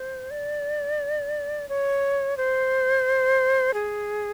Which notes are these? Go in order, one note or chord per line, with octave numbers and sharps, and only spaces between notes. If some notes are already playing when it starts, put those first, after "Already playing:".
Already playing: C5
D5
C#5
C5
G#4